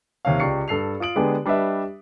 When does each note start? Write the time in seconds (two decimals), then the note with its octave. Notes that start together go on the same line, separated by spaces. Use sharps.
0.25 D#2 C3 C#5 F5
0.40 C#2 G4 D5 C#6 C7 C#7
0.68 G2 A4 C7 F7
1.00 F4 D#6 D7 F#7
1.16 D3 G#3 B3 D4 G4 G#4
1.46 G3 D4 B4 D#5 E5